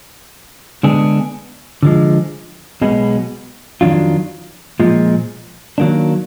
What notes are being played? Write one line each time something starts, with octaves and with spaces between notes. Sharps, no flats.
D3 G#3 B3 D4 G#4
D3 F3 G#3
B1 B2 G#3 B3
F2 D#3 F#3 D4 F4
A#2 F3 G#3
D#3 F#3 A#3 D4